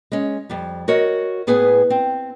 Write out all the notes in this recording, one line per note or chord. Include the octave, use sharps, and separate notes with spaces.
G#3 C#4
F2 G3
F#4 A#4 C#5 D#5 F#5
A2 B3 G#4 B4 G#5
C4